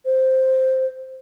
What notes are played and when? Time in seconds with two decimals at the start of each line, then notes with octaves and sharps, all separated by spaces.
0.05 C5